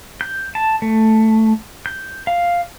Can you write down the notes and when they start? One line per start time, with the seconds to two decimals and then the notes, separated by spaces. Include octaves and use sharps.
0.21 G6
0.55 A5
0.82 A3
1.86 G6
2.27 F5